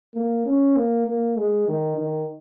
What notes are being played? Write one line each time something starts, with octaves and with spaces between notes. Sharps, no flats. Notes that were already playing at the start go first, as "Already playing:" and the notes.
A#3
C#4
A#3
A#3
G#3
D#3
D#3